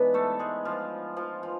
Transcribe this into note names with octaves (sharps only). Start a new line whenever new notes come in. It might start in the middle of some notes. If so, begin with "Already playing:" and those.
Already playing: G#2 E3 B3 D4 B4
A3 A4
G#3 G#4
F3 F4
F3 F4
F3 F4